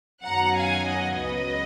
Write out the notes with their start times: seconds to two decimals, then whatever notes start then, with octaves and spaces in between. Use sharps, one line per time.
0.25 F#2 D#3 F#3 B3 F#5 A#5
0.56 F5 G#5
0.87 D#5 F#5
1.18 C#2 C#3 F#3 B3 B4 D#5